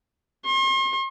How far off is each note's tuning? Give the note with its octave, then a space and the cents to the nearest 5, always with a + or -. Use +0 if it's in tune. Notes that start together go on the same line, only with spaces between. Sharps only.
C6 +45